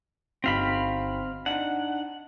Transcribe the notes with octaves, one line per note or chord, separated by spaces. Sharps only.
G1 C4 D#4 F#4 F5 B5
D4 D#4 F#5